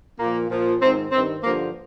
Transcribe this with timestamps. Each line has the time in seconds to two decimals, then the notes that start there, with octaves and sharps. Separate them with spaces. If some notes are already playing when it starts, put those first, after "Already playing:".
0.19 A#2 F3 A#3
0.50 A#2 F3
0.81 G#2 D#3 C4
1.12 G2 D#3 C4
1.43 G2 D3 F3 A#3